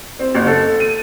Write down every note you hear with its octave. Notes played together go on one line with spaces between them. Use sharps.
C4
F#1
A4
D#7